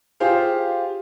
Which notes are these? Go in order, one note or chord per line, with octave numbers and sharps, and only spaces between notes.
F4 G4 G#4 C5 F5